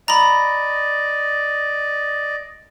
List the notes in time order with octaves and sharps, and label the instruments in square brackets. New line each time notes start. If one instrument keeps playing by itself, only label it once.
[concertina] D5 D#5 [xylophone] A#5 B5